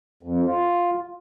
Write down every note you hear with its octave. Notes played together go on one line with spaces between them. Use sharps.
F2
F4